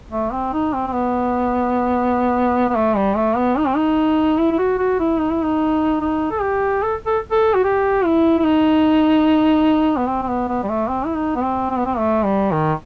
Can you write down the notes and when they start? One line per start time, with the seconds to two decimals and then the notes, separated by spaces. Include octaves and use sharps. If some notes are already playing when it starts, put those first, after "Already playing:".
0.12 A3
0.33 C4
0.53 D#4
0.73 C4
0.87 C4
0.92 B3
2.69 B3
2.76 A3
2.96 G3
3.16 A3
3.37 B3
3.58 D#4
3.67 C4
3.76 D#4
4.39 E4
4.52 E4
4.59 F#4
4.79 F#4
5.00 E4
5.20 D#4
5.31 E4
5.44 D#4
6.01 D#4
6.31 A4
6.41 G4
6.83 A4
7.06 A4
7.31 A4
7.54 F#4
7.64 G4
8.05 E4
8.39 E4
8.45 D#4
9.97 B3
10.07 C4
10.22 C4
10.28 B3
10.48 B3
10.63 G3
10.69 A3
10.89 C4
11.06 E4
11.16 D#4
11.36 B3
11.43 C4
11.70 C4
11.78 B3
11.85 C4
11.98 A3
12.24 G3
12.52 D#3